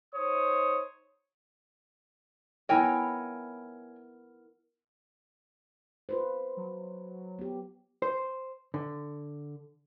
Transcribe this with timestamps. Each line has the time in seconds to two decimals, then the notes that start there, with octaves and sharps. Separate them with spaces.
0.14 D#4 C5 C#5 D#6
2.69 B3 E4 A#4 C#5 G5 G#5
6.09 F4 B4 C5
6.57 F#3
7.39 B3 G4
8.02 C5
8.74 D3